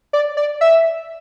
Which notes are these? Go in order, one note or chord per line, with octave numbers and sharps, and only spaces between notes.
D5
D5
E5